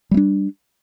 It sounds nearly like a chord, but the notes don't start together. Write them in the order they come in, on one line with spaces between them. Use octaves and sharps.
G3 A3 D4